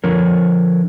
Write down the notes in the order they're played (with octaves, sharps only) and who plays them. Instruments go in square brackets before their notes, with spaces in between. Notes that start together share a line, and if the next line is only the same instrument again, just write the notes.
[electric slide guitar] D3 F3 A#4 C#5